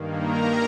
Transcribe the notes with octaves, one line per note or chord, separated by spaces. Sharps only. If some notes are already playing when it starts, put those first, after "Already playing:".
Already playing: G2 D#3 A#3
A#4 A#5